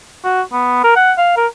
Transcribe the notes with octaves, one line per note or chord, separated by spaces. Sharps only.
F#4
B3
A#4
F#5
F5
A#4